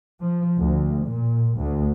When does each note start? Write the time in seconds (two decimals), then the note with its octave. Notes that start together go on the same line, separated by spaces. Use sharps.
0.21 F3
0.59 D2
1.08 A#2
1.58 D2